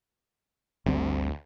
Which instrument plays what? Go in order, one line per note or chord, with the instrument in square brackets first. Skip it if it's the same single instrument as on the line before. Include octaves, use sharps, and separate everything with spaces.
[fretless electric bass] G1 G3 C4 [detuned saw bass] D2